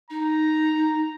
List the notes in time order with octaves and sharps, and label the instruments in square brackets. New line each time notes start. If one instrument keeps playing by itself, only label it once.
[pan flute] D#4 [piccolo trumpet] A#5